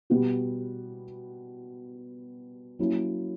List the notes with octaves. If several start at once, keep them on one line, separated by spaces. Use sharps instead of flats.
B2 G3 B3 F#4
F#3 A#3 C#4 E4